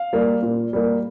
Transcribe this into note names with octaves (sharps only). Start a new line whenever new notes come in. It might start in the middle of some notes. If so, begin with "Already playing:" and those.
Already playing: F5
G3 A#3
A#2
G3 A#3